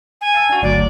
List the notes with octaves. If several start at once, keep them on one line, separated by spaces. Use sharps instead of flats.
G#5
F5 A5 E6
D4 F#4
G1 D2 F#3 D5